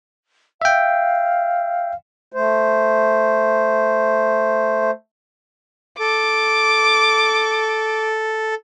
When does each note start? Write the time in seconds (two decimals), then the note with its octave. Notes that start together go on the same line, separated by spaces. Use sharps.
0.62 E5 F5 G5
2.32 A3 C5
6.00 A4 D6